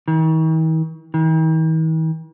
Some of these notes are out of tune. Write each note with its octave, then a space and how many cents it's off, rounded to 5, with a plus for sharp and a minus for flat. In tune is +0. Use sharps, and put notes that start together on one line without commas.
D#3 +45
D#3 +45